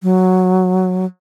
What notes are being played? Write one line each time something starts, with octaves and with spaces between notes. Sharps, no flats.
F#3